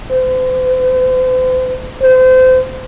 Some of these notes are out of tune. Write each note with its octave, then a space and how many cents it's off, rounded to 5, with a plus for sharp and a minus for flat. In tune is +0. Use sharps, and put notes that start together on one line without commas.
C5 -40
C5 -30